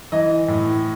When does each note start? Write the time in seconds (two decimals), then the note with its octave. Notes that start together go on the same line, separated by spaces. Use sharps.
0.12 E3 D#5
0.48 A2